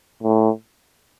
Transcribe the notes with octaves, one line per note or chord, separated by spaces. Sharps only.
A2